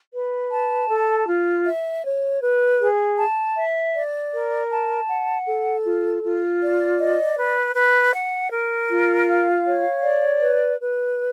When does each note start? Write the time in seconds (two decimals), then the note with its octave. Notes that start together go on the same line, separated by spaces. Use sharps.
0.13 B4
0.51 A5
0.89 A4
1.27 F4
1.65 E5
2.04 C#5
2.42 B4
2.80 G#4
3.18 A5
3.56 E5
3.94 D5
4.32 A#4
4.70 A5
5.08 F#5
5.47 A4
5.84 F4
6.23 F4
6.61 D5
6.98 D#5
7.37 B4
7.75 B4
8.13 F#5
8.51 A#4
8.89 F4
9.28 F5
9.66 C#5
10.03 D5
10.41 B4
10.79 B4